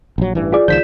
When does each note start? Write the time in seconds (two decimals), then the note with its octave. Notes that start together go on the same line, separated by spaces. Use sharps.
0.18 A#1 F#3
0.35 A1 G2 E3
0.53 F4 G#4 D5
0.68 C#2 D#3 F3 G6 B6 E7